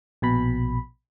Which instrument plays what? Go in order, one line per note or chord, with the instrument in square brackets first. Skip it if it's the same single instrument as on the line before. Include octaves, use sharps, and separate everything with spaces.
[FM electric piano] A#1 B2 B5